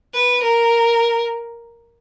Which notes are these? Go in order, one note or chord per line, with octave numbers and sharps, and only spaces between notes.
B4
A#4